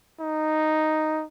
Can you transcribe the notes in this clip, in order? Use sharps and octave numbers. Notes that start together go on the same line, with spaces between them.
D#4